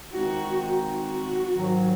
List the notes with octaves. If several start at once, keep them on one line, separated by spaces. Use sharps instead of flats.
D#3 G#3 C4 D#4 F#4
F#4
G#2 D#3 F#3